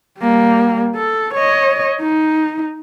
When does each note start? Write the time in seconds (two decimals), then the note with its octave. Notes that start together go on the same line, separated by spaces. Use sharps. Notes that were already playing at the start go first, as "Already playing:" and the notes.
0.20 G3 A#3
0.96 A4
1.34 C#5 D#5
2.01 D#4